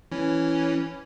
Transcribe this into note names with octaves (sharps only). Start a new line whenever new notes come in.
E3 C#4